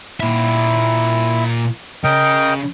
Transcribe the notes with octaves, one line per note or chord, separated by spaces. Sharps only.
A#2 E4 E5
C#3 A#4 D#5 G5